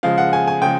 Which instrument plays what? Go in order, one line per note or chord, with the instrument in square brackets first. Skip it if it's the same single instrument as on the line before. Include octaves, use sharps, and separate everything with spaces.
[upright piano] C#3 F3 G#3 F5
F#5
G#5
G#5
C#3 F3 G#3 G5